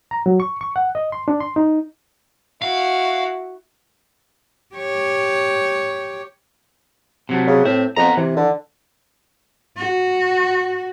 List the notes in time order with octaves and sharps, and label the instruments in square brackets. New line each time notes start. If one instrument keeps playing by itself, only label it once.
[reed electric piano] A#5
F#3
C#6
C#6
F#5
D#5
C6
D4
C6
D#4
[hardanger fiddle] E4 F#4 [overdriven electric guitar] F5
[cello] G4 C#5
[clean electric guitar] C3 F#3 A3
[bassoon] C#3
[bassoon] A2 [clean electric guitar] C4 E5
[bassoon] F2 [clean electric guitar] B3 A#5
[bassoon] C3 [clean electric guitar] E3
[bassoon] D3
[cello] F#4